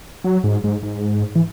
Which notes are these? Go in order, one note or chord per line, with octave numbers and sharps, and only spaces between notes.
F#3
G#2
G#2
G#2
E3